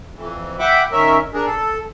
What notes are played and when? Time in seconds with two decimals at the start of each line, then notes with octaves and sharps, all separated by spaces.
0.15 F2 E3
0.59 E5 F#5 G5 B5 D6
0.92 D#3 C#4 A#4 E5
1.33 D4 G#4 A#4
1.46 A4